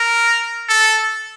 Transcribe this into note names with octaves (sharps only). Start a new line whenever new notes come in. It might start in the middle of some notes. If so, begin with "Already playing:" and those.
Already playing: A#4
A4